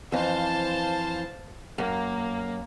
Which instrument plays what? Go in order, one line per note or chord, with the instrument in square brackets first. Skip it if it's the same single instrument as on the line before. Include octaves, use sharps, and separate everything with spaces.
[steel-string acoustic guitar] F2 E3 [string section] C5 F5 A5
[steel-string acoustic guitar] F#2 [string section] A#3